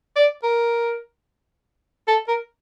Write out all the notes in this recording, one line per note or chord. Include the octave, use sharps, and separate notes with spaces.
D5
A#4
A4
A#4